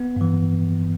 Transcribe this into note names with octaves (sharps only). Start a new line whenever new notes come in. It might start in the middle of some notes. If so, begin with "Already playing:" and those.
Already playing: B3
G2 E3